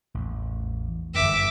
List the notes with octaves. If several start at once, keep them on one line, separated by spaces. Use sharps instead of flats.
A1 E2
G1 F#2 E5 D6